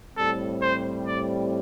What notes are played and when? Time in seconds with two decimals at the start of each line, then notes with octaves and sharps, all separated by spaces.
0.17 A2 G3 C4 A4
0.62 C5
1.07 D5